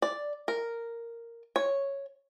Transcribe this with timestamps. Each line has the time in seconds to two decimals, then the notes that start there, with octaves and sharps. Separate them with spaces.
0.02 D5
0.48 A#4
1.56 C#5